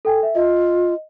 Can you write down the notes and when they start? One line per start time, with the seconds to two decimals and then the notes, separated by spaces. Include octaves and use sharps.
0.05 A4 G5 G#5
0.23 E5
0.35 F4 D#5